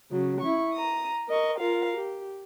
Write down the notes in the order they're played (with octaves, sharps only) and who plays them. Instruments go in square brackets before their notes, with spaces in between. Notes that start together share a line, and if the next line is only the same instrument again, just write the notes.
[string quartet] C#3 F#3
E4 C#6
A#5 D#6
A#4 D#5 C#6
F4 A#4 F5
G4